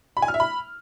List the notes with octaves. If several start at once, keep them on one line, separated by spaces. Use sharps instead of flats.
B5
G#5
F6
E5
B5